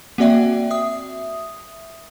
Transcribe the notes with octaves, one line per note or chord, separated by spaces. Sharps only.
A#3 C4 F#4 D5 E5 G5
E5 D#6